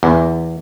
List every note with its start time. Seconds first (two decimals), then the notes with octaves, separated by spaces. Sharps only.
0.03 E2